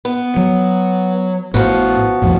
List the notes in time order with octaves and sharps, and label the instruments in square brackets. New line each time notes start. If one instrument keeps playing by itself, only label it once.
[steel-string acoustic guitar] B3
[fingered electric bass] F#3
[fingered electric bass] A1 A2 [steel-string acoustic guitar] F3 B3 F#4
[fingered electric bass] C2 F2 A2